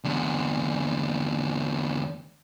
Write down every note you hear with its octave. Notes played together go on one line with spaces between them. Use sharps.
E2 D3